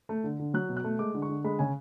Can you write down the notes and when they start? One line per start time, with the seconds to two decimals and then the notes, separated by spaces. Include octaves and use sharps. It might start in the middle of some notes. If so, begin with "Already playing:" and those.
0.09 A3
0.24 D3
0.39 D3
0.54 F#3 F#6
0.69 B2
0.77 F#6
0.84 A3
0.99 G#3 D6
1.14 D3
1.22 C#6
1.29 D3
1.44 G#3 B5
1.59 C#3 G#5